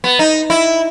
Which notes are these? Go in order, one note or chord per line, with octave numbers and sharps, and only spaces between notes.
B3
D#4
E4